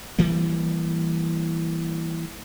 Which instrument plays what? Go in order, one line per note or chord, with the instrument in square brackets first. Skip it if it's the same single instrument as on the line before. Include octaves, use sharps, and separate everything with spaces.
[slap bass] E3 G3 A#3